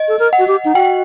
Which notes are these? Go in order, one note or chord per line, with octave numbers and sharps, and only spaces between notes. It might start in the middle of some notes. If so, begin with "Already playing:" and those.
Already playing: D#5
A4
A#4
F#5
F#4
G4
D#4
F#4 G5